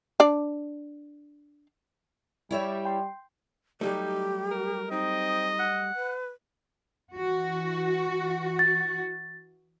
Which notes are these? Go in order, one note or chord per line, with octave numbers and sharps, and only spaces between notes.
D4 D5
G3 E4 C#5 E5
G5 C6
F#3 G3 A3 D#4 G4
A#4
C4 D#4 D#5
F#5
B4
E3 F#4
A6